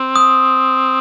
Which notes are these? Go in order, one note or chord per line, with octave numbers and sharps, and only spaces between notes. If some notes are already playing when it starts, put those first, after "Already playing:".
Already playing: C4
D#6